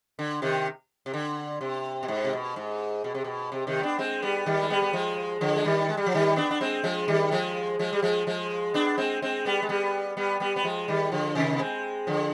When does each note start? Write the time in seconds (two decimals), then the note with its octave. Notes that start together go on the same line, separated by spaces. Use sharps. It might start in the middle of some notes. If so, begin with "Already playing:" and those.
0.19 D3
0.42 C3 D#3
1.06 C3
1.14 D3
1.61 C3
2.03 B2
2.08 G#2
2.25 C3
2.33 B2
2.56 G#2
3.04 B2
3.14 C3
3.24 B2
3.52 C3
3.67 C3 D#3
3.83 B3 D4
3.99 G#3 C4
4.22 G3 B3
4.46 D#3 G3
4.60 G#3
4.70 G3 B3
4.82 B3
4.93 F3 G#3
5.41 D3 F3
5.56 G#3
5.65 D#3 G3
5.89 G#3
5.97 G3
6.06 F3
6.14 D#3 G3
6.36 B3 D4
6.51 D4
6.61 G#3 C4
6.84 F3 G#3
7.08 D#3 G3
7.31 F3 G#3
7.79 F3 G#3
7.93 G3
8.02 F3 G#3
8.27 F3 G#3
8.74 B3 D4
8.98 G#3 C4
9.22 G#3 C4
9.45 G3 B3
9.62 G#3
9.69 G3 B3
10.17 G3 B3
10.40 G3 B3
10.56 B3
10.64 F3 G#3
10.88 D#3 G3
11.11 D3 F3
11.35 C3 D#3
11.53 B3
11.59 G#3 C4
12.07 D3 F3